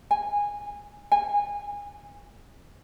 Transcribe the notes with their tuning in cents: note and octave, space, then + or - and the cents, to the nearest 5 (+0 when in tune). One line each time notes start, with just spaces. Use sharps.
G#5 -20
G#5 -25